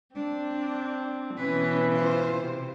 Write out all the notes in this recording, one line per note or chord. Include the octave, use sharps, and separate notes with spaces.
C4 D4
B2 E3 C#4 B4
F4 C5
C3